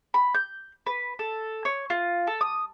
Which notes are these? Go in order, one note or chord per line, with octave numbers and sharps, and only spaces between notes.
B5
G6
B4
A4
C#5
F4
A4
D#6